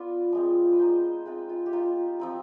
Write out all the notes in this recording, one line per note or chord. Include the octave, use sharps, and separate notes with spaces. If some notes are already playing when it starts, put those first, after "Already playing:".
Already playing: B3 F4 D5
F3 G#3 C4
B4
G#3 B3 D#4 C5
G#3 C4 F4 B4
F4
G4
B3 D#4 F4
F3 C4 D#4